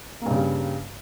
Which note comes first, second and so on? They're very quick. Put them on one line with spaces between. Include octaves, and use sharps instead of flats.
A#3 G2 C#3 G3